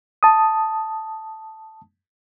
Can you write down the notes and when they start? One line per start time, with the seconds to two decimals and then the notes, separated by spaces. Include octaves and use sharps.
0.23 A5 D#6